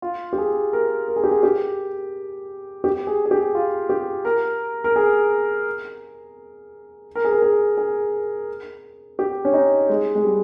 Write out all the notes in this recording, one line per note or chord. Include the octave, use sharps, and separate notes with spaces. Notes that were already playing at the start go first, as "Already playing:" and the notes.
F4
G4
G#4
A#4
A#4
G#4
G4
G#4
G4
G4
G#4
G#4
G4
F4
G4
A#4
A#4
G#4
A#4
G#4
A#4
G#4
G#4
G4
C#4
D#4
G#3
G#3
G3